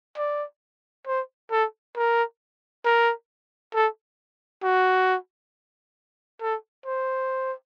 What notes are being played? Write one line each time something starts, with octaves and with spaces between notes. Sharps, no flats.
D5
C5
A4
A#4
A#4
A4
F#4
A4
C5